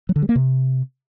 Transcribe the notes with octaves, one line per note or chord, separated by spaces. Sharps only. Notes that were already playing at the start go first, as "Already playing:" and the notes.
F#3
D3
G3
A#3
C3